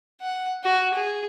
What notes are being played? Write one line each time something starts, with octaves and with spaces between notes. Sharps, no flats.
F#5
F#4
G#4